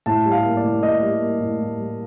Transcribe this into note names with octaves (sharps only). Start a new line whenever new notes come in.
A2 A5
G3
F5
A#3
D5
A2
A2 D#5
G3
A#3
A2
A2
G3